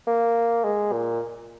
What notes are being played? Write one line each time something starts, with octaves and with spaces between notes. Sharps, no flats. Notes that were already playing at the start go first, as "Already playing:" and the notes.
A#3
G#3
A#2